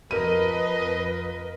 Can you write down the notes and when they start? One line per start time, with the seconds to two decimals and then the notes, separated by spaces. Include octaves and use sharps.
0.11 F2 F3 A#4 B4 D#5 D#7